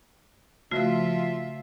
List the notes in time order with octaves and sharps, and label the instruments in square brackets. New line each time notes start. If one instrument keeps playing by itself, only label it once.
[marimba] C#3 A3 F#4 [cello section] F3 F4 E5